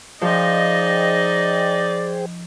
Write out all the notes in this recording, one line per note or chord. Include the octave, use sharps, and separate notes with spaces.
F3 D#4 G#4 C5 D5 D#5 G5